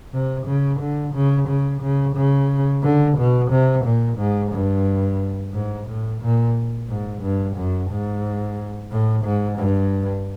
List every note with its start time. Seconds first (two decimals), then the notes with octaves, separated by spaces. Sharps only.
0.13 C3
0.46 C#3
0.80 D3
1.14 C#3
1.48 C#3
1.82 C#3
2.16 C#3
2.83 D3
3.18 B2
3.51 C3
3.85 A#2
4.18 G#2
4.52 G2
5.54 G#2
5.88 A2
6.22 A#2
6.89 G#2
7.22 G2
7.56 F#2
7.90 G#2
8.91 A2
9.25 G#2
9.59 G2